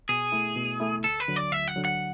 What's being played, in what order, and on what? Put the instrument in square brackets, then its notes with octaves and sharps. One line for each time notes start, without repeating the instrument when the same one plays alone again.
[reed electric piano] B2 [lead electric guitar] G#4
[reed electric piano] A3 E4
B2
A3 E4
[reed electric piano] D2 [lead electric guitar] A4
[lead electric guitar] B4
[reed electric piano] D3 F#3
[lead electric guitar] D5
[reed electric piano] D2 [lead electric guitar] E5
[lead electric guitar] F#5
[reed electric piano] D3 F#3
[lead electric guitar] F#5